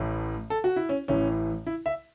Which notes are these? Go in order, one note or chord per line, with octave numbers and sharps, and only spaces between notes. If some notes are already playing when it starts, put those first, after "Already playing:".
Already playing: A1 A2 E3
A4
F#4
E4
C#4
A1 A2 E3 C#4
E4
E5